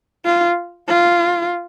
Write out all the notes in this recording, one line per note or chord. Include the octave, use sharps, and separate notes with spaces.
F4
F4